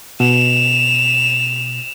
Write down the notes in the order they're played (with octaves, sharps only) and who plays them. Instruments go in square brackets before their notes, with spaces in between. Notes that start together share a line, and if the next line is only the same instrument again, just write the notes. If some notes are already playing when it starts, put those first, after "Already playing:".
[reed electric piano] B2 [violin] E7 F7